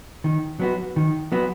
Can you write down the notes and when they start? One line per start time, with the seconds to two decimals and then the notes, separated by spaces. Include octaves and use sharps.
0.24 D#3
0.60 F#3 B3 F#4
0.96 D#3
1.32 F#3 B3 F#4